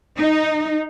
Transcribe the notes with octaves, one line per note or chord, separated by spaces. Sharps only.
D#4